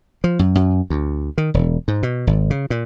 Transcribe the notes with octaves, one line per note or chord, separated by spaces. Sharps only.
F3
F#2
F#2
D2
D#3
E1
G#2
B2
G#1
C#3
A#2